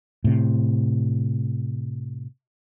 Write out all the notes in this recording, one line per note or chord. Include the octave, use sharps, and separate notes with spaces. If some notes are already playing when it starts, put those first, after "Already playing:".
A2 C3